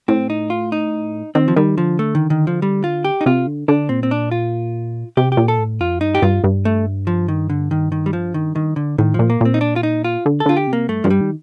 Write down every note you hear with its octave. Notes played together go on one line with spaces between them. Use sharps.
A2 C4
D#4
F4
D#4
D#3 C4
F3
D#3 G3
D3 F3
A3
D#3
D#3
F3
G3
F4
G4
D#4
C3 F4
D3
D3 D4
A#2 C4
C4
D4
F4
C3 G4
G4
A#2
A4
A2
F2 F4
G2 D#4
G4
G2 F4
G2
A3
F3
D#3
D3
D#3
D#3
G3
F3
D#3
D#3
D3
A2 D#3
A#2 F3
A#3
A#2 C4
D#4
D4
F4
D#4
F4
D3
A4
D3 F4
G4
C3
A#3
G2 A3
G2 F3
G3
D#3